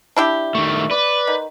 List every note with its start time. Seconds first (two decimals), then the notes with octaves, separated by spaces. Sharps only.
0.16 D4 E4 G4
0.55 D#3 A3
0.91 B4 D5
1.27 D#3